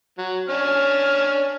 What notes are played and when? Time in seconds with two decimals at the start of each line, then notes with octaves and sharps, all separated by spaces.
0.18 F#3
0.48 C#4 D4 F6